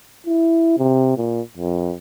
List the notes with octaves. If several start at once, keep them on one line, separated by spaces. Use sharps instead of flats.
E4
C3
A#2
F2